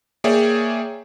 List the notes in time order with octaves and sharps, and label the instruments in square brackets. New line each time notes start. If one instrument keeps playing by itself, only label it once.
[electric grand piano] A#3 G#4 C#5 D5 E5 G5